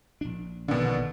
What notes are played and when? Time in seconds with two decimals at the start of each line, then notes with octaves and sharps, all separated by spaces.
0.21 A#1 D4
0.68 B2 D3 D#3